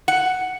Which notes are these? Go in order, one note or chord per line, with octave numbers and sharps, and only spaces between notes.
F#5